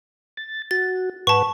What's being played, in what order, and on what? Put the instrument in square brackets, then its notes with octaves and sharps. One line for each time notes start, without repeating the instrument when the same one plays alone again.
[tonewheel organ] A6
[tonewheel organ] F#4 [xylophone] A6
[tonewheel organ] G#2 B4 F#5 [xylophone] A5 C#6